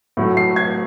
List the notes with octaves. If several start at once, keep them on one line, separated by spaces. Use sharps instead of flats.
A2 F#3 A3
C7
G#6